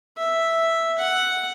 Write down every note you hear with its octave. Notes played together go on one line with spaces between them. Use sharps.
E5
F#5